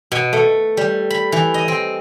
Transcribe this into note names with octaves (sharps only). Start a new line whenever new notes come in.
B2
A3
G3
B5
E3
D#5
C4